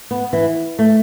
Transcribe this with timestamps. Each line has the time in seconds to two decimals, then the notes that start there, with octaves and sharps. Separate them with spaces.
0.11 B3
0.33 E3
0.79 A3